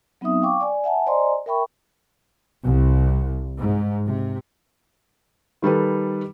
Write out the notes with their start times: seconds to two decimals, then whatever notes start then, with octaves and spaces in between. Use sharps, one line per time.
0.21 F#3 B3 C4 D#4 E5 D#6
0.42 F5 G5 C#6 D6
0.61 D5 G#5
0.84 E5 F#5 G#5 A5
1.06 C5 D5 D#5 G#5 A#5 C6
1.46 A#4 E5 G5 B5 C#6
2.63 C2
3.56 G#2
4.04 C3
5.62 D#3 G3 A4 B4